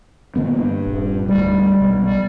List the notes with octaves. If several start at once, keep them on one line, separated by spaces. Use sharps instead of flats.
D3 A#3 B3
G2
D#1
D2 G#2 G3
B1
G3